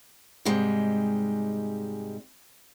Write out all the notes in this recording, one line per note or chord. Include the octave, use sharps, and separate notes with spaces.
G#2 C3 G3 G#3